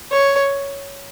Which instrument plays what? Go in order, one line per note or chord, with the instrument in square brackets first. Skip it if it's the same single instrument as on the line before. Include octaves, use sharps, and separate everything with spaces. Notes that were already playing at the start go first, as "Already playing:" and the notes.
[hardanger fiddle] C#5